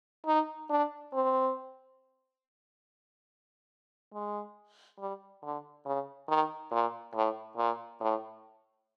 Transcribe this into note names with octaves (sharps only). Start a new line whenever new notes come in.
D#4
D4
C4
G#3
G3
D3
C#3
D#3
A#2
A2
A#2
A2